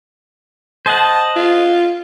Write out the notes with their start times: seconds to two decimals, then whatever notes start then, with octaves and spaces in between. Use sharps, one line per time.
0.86 C5 D#5 F#5 A5
1.36 F4